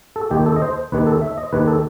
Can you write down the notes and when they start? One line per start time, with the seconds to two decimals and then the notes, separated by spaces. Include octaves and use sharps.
0.16 A4
0.30 D#2 D#3 G4
0.46 A4
0.56 D#5
0.62 C5
0.92 D#2 D#3 B4
1.07 A4
1.22 E5
1.38 D#5
1.53 D#2 D#3 B4
1.68 A4